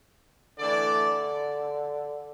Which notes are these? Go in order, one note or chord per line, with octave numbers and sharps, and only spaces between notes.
D3 E3 A3 D4 A4 D5